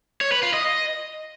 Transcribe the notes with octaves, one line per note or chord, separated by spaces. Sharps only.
C#5
B4
F4
D#5